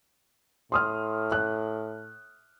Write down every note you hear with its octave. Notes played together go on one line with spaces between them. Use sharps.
A2 C6 D#6 F6
F#6